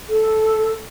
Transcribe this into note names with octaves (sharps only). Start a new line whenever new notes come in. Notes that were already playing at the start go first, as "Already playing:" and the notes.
A4